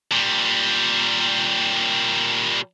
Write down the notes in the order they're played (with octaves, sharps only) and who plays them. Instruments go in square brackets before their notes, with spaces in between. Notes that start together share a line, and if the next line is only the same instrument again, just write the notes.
[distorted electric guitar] A#2 G3